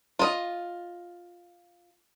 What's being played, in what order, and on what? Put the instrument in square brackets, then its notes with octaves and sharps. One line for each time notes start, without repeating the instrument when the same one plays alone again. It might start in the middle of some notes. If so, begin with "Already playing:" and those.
[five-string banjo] F4 D#5